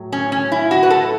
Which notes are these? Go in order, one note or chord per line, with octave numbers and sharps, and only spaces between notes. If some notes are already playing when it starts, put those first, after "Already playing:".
Already playing: A2 F#3
C#4
C#4
E4
F#4
B4
A4